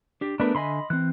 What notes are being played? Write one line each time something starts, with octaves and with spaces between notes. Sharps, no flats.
D4 G4
A3 B3 D4 A#4 B4
D3 D#5 E5 G#5 B5 C6
E3 C4 F#6